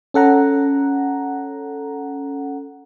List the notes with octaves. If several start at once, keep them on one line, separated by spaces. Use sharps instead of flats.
C#4 A4 F#5 A#5